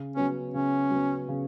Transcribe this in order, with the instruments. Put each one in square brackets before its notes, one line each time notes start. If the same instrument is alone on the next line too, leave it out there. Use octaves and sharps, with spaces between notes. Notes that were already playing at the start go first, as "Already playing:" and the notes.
Already playing: [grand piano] C#3
[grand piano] F#3 B3 [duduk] C#4
[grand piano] C#3 [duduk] C#4
[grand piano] F#3 B3
C#3